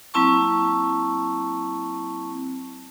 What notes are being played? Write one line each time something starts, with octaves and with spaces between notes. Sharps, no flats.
F#3 A#3 C4 E4 A5 C#6